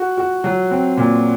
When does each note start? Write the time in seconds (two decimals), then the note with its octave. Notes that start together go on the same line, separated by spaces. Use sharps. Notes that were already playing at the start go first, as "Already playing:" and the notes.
Already playing: F#4
0.17 F#4
0.44 F#3
0.71 C4
0.97 A#2